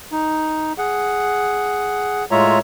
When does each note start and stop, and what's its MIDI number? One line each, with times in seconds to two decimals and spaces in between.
0.12 0.73 63
0.78 2.25 68
0.78 2.25 78
2.31 2.59 45
2.31 2.59 56
2.31 2.59 65
2.31 2.59 73
2.31 2.59 76
2.31 2.59 82